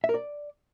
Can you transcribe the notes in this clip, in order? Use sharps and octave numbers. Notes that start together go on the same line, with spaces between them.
E5
A#4
D5